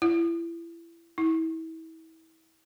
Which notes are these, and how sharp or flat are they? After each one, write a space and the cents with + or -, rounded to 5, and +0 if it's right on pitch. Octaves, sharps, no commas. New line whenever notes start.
E4 +30
E4 -30